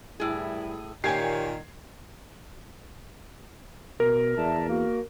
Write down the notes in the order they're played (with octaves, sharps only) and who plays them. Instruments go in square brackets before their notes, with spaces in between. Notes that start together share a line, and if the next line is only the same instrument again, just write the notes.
[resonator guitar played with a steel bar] A2 G#4 [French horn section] E3 G3 E4
[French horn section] A#2 [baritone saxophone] D#3 [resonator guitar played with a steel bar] G4 C#5 [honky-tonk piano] G#5 G#6 C7
[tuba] B2 [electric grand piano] A#4
[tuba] E2 [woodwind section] D5 E5 A5
[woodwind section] A#3 F#4